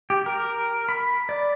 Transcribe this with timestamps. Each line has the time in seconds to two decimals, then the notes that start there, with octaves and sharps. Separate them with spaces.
0.10 G4
0.26 A#4
0.89 B5
1.29 D5